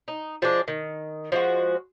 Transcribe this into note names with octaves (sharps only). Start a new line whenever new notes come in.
D#4
F3 G#3 D4
D#3
F3 G#3 F#4